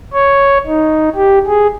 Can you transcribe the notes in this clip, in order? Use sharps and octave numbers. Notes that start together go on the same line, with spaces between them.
C#5
D#4
G4
G#4